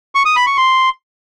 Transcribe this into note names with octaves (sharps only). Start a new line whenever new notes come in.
C#6
D#6
B5
C#6
C6